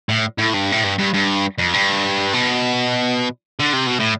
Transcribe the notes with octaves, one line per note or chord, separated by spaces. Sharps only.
A2
A2
G2
A2
G2
G2
G2
F2
G2
B2
D3
C3
B2
A2